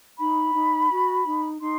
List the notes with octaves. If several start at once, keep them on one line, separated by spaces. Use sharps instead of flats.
D#4 B5
D#4
F#4
D#4
D#4 C6